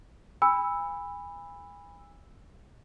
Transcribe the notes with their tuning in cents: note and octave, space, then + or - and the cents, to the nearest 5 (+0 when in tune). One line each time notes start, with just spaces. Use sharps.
G#5 -35 B5 +0 E6 +0